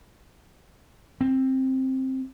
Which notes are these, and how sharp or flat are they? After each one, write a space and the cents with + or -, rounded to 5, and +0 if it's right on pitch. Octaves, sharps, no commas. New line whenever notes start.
C4 +10